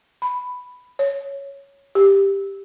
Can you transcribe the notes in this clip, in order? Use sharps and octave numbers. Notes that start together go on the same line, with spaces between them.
B5
C#5
G4